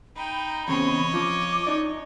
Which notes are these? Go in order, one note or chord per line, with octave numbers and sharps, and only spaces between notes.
D#4 G5 B5
E2 C#3 C4 C#5 D#5
F3 D6
D#4 D5